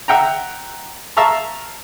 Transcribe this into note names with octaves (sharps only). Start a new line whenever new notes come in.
E5 F#5 G5 A#5
E5 F5 A5 A#5 C#6